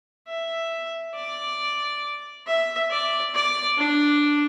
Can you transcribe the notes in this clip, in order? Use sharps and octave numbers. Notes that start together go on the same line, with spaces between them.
E5
D5
E5
D5
D5
D4